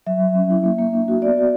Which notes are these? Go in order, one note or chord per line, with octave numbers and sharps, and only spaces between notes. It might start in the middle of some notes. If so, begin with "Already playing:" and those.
F#3 E5
F#3
C#4
E4
A#3
A#3
D4
F#4
B3 D5
F#4